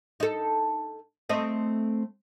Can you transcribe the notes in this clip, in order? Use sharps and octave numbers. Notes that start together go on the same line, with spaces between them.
D#4 A4
A3 C4 D#5